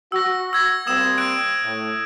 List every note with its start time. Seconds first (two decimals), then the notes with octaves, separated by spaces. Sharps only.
0.12 F#4 E6 A#6
0.53 E6 G#6 A#6
0.87 G3 A#3 C4 D#6 E6 E7
1.18 D#6 F#6 D7
1.63 A2